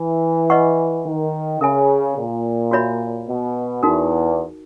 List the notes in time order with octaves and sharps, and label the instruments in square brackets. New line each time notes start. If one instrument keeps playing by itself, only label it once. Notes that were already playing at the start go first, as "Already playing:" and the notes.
Already playing: [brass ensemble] E3
[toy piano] B4 D#5 F#5 C#6
[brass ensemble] D#3
[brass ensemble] C#3 [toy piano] A#4 E5 G#5 B5
[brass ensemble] A#2
[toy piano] F#4 C#5 E5 B5
[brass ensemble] B2
[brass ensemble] E2 [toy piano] D#4 F#4 A#4